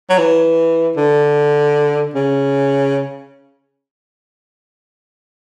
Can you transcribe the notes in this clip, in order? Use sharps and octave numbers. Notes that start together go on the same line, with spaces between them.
F#3
E3
D3
C#3